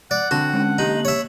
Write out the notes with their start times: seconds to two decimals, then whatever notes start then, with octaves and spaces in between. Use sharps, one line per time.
0.11 D5 F#5
0.31 D3 C4 F#4
0.54 G#3 C#4
0.79 A#3 D#4 G4 F#7
1.05 C#5 E5